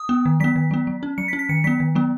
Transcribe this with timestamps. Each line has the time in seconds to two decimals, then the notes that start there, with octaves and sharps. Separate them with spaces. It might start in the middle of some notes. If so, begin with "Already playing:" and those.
Already playing: D#6
0.09 B3
0.25 D#3
0.40 F#3 B3 B6
0.56 D#3
0.71 F#3 B3
0.87 F#3
1.03 C#4
1.18 F#3 C#7
1.28 B6
1.33 C#4
1.39 B6
1.49 D#3 C#7
1.64 F#3 B3 B6
1.80 D#3
1.95 F#3 B3